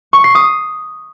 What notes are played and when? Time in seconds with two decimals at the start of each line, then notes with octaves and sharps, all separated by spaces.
0.13 C#6
0.24 C7
0.35 D#6